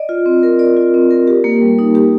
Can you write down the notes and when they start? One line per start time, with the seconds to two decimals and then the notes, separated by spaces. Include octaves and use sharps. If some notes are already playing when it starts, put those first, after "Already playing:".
Already playing: D5 D#5
0.09 F4
0.26 C4
0.43 A#4
0.59 D5
0.77 F4
0.94 C4
1.11 A#4
1.27 G4
1.44 A#3
1.62 G3
1.79 D#4
1.95 G4